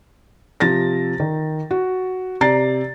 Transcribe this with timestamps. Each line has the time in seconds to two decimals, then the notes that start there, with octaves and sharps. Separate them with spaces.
0.60 C3 F3 A6 A#6
1.20 D#3
1.71 F#4
2.41 C3 D5 A#5 A6 C7